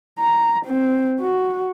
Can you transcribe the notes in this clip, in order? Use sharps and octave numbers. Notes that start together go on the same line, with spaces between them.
A#5
C4
F#4